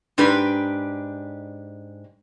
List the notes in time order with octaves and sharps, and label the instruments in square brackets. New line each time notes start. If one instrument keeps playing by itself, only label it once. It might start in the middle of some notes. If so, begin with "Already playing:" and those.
[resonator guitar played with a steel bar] G#2 D4 G4 B4